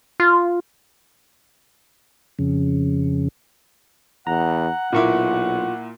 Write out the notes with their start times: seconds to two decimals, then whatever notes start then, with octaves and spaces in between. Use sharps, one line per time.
0.20 F4
2.39 F2 C#3
4.27 E2 F#5 A#5
4.93 B1 A#2 A#3 E4 F4 C#6 D6